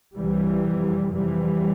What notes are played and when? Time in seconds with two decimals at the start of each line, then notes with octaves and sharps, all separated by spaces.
0.17 C2 C3 E3 G3
0.65 F2 C3
1.13 F2 C3 E3 G3